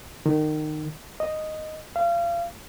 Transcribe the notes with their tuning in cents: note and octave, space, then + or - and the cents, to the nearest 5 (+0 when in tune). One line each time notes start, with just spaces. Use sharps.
D#3 -25
D#5 -5
F5 -30